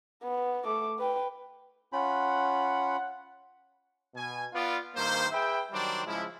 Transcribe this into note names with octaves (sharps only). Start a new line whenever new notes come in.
B3
A3 D6
B4 G5
C#4 F4 F#5 B5
B2 G#5
B3 F4 D5
G2 D#3 A#3 C5
G#4 B4 E5 G5
D#3 F#3 G3 D4 C5 D5
C#3 F3 G#3 E4